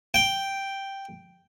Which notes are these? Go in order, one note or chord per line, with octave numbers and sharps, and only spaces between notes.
G5